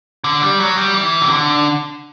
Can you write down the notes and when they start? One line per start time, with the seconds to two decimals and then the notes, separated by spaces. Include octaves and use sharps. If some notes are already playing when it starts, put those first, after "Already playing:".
0.24 D3
0.42 G3
0.60 F#3
0.77 G3
0.94 E3
1.22 C3
1.30 D3